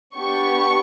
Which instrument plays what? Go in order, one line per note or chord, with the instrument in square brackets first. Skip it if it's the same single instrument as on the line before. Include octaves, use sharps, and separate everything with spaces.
[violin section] B3 D4 G4 C#6